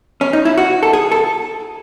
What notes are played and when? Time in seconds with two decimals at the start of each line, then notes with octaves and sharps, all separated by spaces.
0.21 C#4
0.33 D#4
0.45 E4
0.58 F#4
0.83 A4
0.93 G#4
1.12 A4